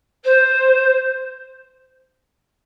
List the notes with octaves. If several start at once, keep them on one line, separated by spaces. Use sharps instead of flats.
C5